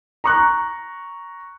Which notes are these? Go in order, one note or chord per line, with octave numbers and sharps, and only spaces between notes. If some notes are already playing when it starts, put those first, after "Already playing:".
A#5 C#6 F#6